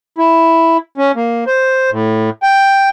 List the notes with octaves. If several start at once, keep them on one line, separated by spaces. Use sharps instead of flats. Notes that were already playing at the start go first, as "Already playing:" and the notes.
E4
C#4
A#3
C5
A2
G5